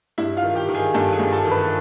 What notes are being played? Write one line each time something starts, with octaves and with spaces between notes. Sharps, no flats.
G2 E4 E5
F4 F5
D#3
G4 G5
D#3
G#4 G#5
G2 A4 A5
G#4 G#5
G2
A4 A5
D#3
B4 B5